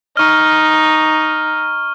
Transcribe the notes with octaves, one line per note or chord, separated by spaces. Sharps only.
D#4 C#6 F6